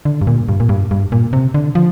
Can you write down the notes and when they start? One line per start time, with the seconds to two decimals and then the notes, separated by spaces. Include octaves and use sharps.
0.05 D3
0.21 G2
0.27 A#2
0.49 G2
0.60 A#2
0.69 G2
0.91 G2
1.12 A#2
1.33 C3
1.54 D3
1.75 F3